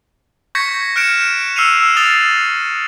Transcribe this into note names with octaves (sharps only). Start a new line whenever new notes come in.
C#6 G6 G#6 A#6 B6 C#7
F6 F#6 C#7 D7 E7
E6 F6 C7 C#7 D#7 F7
D#6 A6 C7 F7 G7